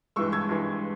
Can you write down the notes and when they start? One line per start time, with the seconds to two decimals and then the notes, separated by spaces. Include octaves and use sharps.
0.16 G2 E3 G#3 C#6 E6
0.32 E6 G#6
0.49 G2 E3 G#3